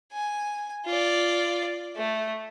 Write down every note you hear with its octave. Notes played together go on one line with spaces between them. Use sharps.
G#5
F4 D5
A3